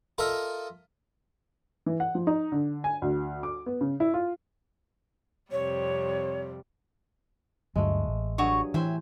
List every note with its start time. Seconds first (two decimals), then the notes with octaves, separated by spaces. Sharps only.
0.18 F4 A4 A#4 D#5 E5
1.86 E3
2.00 F#5
2.15 F3
2.27 D#4
2.52 D3
2.84 G#5
3.02 D2
3.43 D6
3.66 B3
3.81 C#3
4.00 E4
4.14 F4
5.51 F2 C3 G3 C#5
7.76 D2 G2 F#3 G#3 A3
8.08 A1
8.38 G2 F#3 F#4 G#4 C#5
8.74 A2 E3 C5 E5 G5 G#5